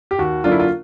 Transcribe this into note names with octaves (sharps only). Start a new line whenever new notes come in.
G4
D#2 F#4
D3 F#3 A#3 D4 F4
E4
F4